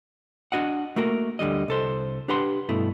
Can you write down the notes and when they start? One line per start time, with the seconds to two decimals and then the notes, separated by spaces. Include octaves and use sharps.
0.52 D4 F#4 D#5 F#5
0.96 A3 A#3 F#4 A#4
1.39 D2 D3 G3 D#5
1.68 C2 A4 C5
2.28 D4 G4 B4 F#5 C6
2.69 G2 B2 A3 E4